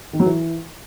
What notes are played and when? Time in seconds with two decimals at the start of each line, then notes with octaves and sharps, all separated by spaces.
0.13 D#3
0.20 F#3
0.26 E3